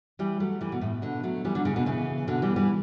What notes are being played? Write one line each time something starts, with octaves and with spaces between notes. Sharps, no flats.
E3 G3
F#3 A3
E3 G3
B2
A2
B2 D3
F#3 A3
E3 G3
D3 F#3
C#3 E3
B2 D3
C#3 E3
B2 D3
E3 G3
E3 G3